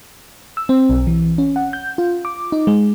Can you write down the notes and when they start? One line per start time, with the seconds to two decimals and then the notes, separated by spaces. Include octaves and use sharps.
0.57 E6
0.69 C4
0.90 B1
1.07 E3
1.38 C#4
1.56 F#5
1.73 G6
1.98 F4
2.25 D6
2.52 D#4
2.67 G#3